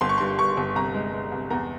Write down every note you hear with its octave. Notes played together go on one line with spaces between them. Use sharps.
G1 C6
C#6
G2 C6
G2 C#6
G1
C2 A#5
G#3
G#3
C2
E2 A#5